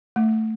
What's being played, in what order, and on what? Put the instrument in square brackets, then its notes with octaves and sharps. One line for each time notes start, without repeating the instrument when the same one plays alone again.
[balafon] A3